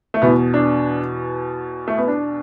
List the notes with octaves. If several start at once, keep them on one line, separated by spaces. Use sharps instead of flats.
A3
E2 B2 B3
D4
A3
B3
D4